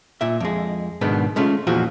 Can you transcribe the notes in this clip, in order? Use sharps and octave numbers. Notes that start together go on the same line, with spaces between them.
A#2 E5
F2 G#3
G#2 B2 D#3 B3 D4
G#3 A3 C#4 F4
E2 A#2 F3 F#4